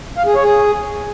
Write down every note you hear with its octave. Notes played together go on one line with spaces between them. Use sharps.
F5
G#4
C#5
G#4